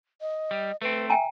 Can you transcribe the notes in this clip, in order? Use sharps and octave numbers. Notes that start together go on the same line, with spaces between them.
D#5
G3
A3 C4 B4
E5 G5 G#5 A#5